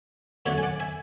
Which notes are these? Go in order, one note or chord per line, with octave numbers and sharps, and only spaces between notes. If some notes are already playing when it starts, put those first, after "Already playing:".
F#2 D3 A3 D4 C#5 E5
G#5
D5 F#5
E5 G#5